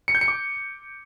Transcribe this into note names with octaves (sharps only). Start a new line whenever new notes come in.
C#7
G6
C#7
D6